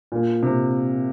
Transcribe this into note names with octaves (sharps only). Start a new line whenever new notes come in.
A#2
C3